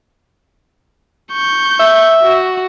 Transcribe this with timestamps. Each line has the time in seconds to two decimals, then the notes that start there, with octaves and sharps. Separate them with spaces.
1.32 C#6 G6
1.79 E5
2.22 F#4